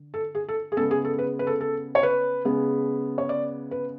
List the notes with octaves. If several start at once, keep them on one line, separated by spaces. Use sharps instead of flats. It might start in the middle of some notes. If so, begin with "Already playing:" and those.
Already playing: D3
A4
G#4
A4
G#4
C#3 G#3 B3 A4
G#4
A4
B4
B4
A4
A4
C#5
B4
C#3 G#3 B3
C#5
D5
B4